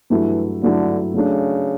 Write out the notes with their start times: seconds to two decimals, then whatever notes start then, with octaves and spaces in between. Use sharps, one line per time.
0.10 G2 E3 F#3 A3 E4
0.63 G2 D3 F#3 A3 E4
1.14 C#3 F#3 A3 D4